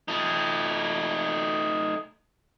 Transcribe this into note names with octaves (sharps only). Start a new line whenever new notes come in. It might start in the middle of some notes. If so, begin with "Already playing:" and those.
A3 D#4